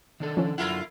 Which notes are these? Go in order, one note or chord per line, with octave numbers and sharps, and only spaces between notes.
D#3 D4 A4
F3 C#4
F#2 D3 E4 F4 A#4 F#5